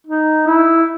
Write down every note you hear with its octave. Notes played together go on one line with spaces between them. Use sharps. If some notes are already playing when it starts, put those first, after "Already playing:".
D#4
E4